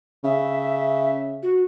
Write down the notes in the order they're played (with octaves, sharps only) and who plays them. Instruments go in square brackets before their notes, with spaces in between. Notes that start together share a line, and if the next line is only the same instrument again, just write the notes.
[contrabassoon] C#3 [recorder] E5
[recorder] F#4